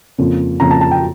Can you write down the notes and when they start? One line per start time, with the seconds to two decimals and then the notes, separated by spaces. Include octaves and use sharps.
0.18 F2 C#3 F3 A#3
0.60 F2 C#3 F3 A#3 A#5
0.71 A5
0.81 A5
0.91 G5